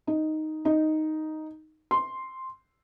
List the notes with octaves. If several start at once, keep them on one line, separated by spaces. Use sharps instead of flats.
D#4
D#4
C6